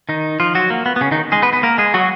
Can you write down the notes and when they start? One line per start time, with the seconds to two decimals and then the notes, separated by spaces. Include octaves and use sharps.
0.09 D#3 D#4
0.40 F3 F4
0.55 F#3 F#4
0.70 A#3
0.86 B3
0.96 B3
1.01 C#3 C#4
1.11 D#3 D#4
1.32 G#3 G#4
1.42 B3 B4
1.53 B3 B4
1.63 A#3 A#4
1.78 G#3 G#4
1.94 F#3 F#4